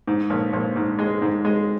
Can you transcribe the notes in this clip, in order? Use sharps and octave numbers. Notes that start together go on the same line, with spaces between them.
G#2
A#1
A#1
G#2
G#3
G#2
G#3